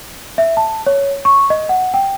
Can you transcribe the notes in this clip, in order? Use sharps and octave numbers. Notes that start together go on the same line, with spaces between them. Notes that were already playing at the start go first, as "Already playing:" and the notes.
E5
A5
C#5
C#6
D#5
F#5
G5